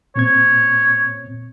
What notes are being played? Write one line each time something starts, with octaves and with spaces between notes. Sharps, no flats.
A#2 C4 C#5 G#6